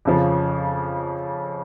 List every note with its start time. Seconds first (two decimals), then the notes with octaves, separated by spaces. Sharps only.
0.05 F2 C#3 F3